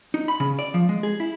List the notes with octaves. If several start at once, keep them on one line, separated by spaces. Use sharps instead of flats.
D#4
B5
C#3
D5
F3
G#3
G#4
E4